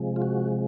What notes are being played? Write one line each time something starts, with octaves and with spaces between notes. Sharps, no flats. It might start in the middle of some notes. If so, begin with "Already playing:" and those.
Already playing: C3 F3 G#3
F4
F#4